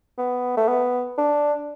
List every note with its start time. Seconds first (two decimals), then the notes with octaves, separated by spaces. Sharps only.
0.18 B3
0.57 A3
0.68 B3
1.18 D4